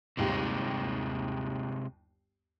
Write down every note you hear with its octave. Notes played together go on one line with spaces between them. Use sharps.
G1 D#2 C3 G#3 G4